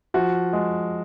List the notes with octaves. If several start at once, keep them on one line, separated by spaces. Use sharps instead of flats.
F3 F#4
G#3